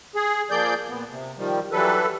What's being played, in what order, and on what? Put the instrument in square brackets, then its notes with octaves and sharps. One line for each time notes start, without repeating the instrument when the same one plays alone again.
[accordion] G#4
F3 A#3 G#4 D5 G6
A#2 B3
C3
D#3 F3 G3
E3 F#3 G3 A4 B4